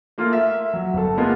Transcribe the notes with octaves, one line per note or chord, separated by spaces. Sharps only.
A3 A#3 F4
E5
F#3
G1 A4
G#3 A#3 B3 F4